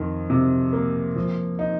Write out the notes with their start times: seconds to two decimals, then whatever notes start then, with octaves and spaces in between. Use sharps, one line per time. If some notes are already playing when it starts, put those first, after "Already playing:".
Already playing: F2 D#3
0.30 C3
0.73 A#3
1.16 F3
1.59 D#4